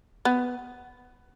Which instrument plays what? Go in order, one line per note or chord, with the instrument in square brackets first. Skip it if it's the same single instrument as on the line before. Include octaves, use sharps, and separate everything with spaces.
[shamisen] B3